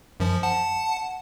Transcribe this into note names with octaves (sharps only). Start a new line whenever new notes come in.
F#2 F3
F#5 A5